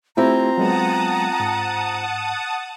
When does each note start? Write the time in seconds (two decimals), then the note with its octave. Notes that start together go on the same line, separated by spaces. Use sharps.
0.17 A3 C4 E4 F4 G4 A#5
0.58 F#3 G#3 B3 F#5 A5 D#6
1.40 G#2